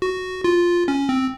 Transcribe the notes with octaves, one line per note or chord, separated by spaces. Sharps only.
F#4
F4
C#4
C4